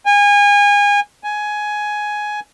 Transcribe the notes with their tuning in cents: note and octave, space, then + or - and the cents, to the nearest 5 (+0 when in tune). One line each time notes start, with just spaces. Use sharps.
G#5 -30
G#5 +10